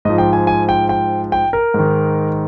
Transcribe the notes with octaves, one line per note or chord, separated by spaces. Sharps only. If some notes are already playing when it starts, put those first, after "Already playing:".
G#2 F3 D#5
G5
G#5
G#5
G5
G5
G5
A#4
G#2 D#3